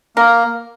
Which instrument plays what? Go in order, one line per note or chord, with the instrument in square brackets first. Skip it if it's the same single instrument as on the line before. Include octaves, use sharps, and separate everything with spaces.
[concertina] A#3 [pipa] A#4